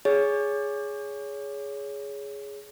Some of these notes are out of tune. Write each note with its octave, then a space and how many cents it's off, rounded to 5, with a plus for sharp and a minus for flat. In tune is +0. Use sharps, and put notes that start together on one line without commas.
G#4 +0 C#5 +20